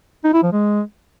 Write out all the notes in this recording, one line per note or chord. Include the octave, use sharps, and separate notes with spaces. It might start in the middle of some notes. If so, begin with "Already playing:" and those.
D#4
E4
F3
G#3